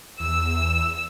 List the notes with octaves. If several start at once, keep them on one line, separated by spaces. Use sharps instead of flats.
E2 E6